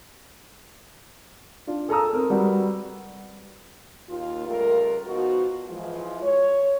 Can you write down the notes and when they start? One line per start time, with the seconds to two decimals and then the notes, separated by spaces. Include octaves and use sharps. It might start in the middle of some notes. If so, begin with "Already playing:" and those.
1.67 D4 F4
1.89 G#4 A4 A5 A#5 D#6 E6
2.13 C4 A#4
2.30 G3 F#4 B4
4.09 D#2 F4
4.47 C#2 G3 A3 F4 A#4
5.06 B2 F3 B3 D#4 F4 F#4
5.68 E3 F3 G#3 F4
6.22 C#5